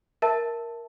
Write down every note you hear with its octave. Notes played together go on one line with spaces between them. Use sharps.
A#4 E5 A5